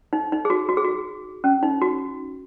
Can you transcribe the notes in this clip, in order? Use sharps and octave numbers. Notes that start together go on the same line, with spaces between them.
D#4
D#4
G#4
F#4
F#4
G#4
F#4
C#4
D#4
F#4